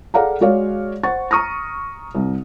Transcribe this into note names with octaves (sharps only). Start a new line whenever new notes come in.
G#4 A4 D5 F5 F#5 A#5
G#3 F#4 C#5 D5 F5
C5 F#5 C#6 A6
A#5 C#6 D#6 F6 A#6
C2